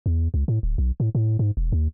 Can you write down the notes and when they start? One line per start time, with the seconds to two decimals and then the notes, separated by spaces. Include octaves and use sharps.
0.06 E2
0.34 C#2
0.48 A2
0.63 D1
0.78 B1
1.00 A2
1.15 A2
1.39 G#2
1.57 E1
1.72 D#2